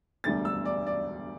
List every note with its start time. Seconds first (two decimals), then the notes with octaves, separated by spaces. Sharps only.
0.24 E1 D2 D3 G3 A6
0.45 E6
0.65 D5
0.87 D5